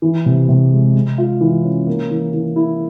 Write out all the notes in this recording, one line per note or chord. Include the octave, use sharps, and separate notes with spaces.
E3
C3
C3
G#3
G#3
F4
E3
C#4
A#3
E3
E3
E4